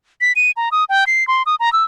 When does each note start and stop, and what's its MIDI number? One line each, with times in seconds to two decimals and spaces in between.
0.21 0.33 95
0.36 0.51 99
0.57 0.69 82
0.72 0.84 87
0.89 1.04 79
1.07 1.26 96
1.28 1.43 84
1.46 1.55 87
1.60 1.72 82
1.73 1.84 88